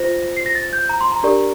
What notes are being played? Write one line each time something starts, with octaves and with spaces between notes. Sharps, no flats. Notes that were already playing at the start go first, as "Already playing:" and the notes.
Already playing: F4 C5 A#6
C7
A#6
A6
G6
A#5
C6
A#5
D4 G4 A#4 D5